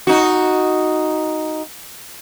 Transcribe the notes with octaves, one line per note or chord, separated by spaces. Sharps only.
D#4 F#4